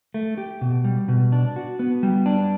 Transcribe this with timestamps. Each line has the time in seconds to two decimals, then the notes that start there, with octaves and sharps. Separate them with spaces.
0.14 A3
0.37 G4
0.61 B2
0.84 G3
1.08 B2
1.32 D4
1.56 F#4
1.79 B3
2.03 G3
2.26 D4